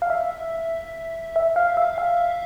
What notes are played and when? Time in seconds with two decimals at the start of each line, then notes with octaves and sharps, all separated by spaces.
0.02 F5
0.10 E5
1.36 E5
1.56 F5
1.77 E5
1.98 F5